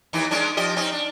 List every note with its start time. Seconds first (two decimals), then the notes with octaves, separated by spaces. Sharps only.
0.13 D#2 E3 D#4
0.31 G#3 C#4 D4
0.57 F3 G4 D#5
0.76 C4 C#4 D#4
0.92 D4